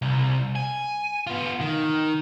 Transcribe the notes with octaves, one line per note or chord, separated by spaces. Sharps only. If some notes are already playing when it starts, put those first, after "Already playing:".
C2
G#5
B3 F4
D#3